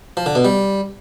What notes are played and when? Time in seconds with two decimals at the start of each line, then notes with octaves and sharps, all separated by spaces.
0.17 F3
0.26 D3
0.35 B2
0.45 G3